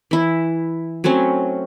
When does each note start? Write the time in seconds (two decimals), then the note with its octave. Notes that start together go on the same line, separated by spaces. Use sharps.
0.11 E3 E4
1.04 F#3 A3 C4 C#4